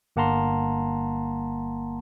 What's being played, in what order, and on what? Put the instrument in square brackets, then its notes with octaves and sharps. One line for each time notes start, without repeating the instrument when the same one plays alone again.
[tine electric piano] G1 A#3 F#5 A5 A#5 C6